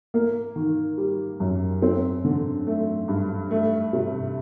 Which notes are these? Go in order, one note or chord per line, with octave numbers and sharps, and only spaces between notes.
A#3
D#3
G3
F#2
C4
D3
A3
G2
A3
C3